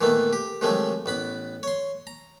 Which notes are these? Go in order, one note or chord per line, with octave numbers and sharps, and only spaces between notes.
A#2 D#3 E3 A3 B3
G4
C3 D#3 F3 F#3 G#3 A3
A1 B3 B5
C#5 C6
A#5